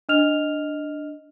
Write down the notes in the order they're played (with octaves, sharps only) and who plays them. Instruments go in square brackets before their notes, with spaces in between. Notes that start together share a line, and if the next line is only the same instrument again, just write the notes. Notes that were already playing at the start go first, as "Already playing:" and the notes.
[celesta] D4 D#5 F6 F7